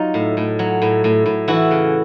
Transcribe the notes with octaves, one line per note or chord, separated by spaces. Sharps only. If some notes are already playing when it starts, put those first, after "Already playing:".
Already playing: F#3 D#4 F4
A2
A2
F#3
A2
A2
A2
E3 E4 F#4
C#3